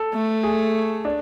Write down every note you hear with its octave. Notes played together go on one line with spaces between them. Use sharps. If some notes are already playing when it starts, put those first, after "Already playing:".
Already playing: A4
A3
G#4
D4